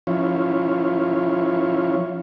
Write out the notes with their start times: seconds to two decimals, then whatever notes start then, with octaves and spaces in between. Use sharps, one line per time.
0.07 F3 C#4 E4 F4 C#5